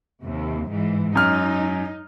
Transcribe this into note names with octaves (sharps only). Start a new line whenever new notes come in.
D#2 C3
G#2 E3
F#2 D#4 F6